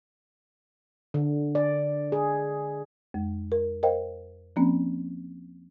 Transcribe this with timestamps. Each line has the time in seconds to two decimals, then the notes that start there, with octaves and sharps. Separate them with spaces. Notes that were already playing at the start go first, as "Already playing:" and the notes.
1.14 D3
1.55 D5
2.12 G#4
3.14 F2 G#3
3.52 A#4
3.83 A#4 C5 D#5 F5 G5
4.56 F3 A#3 C4 C#4